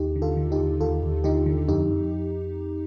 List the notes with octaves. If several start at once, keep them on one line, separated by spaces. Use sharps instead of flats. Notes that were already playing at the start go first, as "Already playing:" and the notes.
Already playing: D#2 D#4 G4
D3
F4 A4
D3
D#4 G4
D#2
D#2 F4 A4
D#2
D3 D#4 G4
D3
F2 D#4 G4
F2